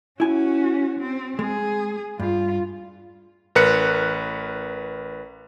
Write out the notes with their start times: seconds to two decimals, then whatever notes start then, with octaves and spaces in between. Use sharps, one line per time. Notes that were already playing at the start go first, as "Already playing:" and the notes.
0.20 C#4 E4 F#4 G#5
0.99 C4
1.39 G#3 G#4
2.20 G2 F4
3.55 A1 A#4 B4 F#6 C#7